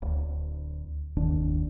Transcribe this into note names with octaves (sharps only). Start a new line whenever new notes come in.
D1 D2
F#1 D#2 D#3 D4